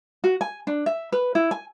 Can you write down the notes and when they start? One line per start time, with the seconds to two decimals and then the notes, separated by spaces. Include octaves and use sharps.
0.24 F#4
0.41 G#5
0.67 D4
0.86 E5
1.12 B4
1.35 E4
1.51 G#5